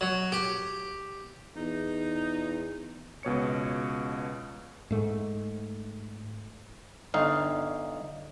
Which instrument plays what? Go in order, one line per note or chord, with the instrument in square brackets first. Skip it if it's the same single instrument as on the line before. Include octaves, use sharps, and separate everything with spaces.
[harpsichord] F#3
G4
[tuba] E2 [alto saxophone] D#4
[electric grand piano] C#2 B2 C#5 C#7
[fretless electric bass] G#2 A3
[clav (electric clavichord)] G1 D3 D#4 F5